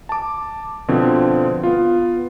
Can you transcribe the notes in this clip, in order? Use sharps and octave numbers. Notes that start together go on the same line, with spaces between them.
A5 D6
B2 D3 F3 C4
B3 F4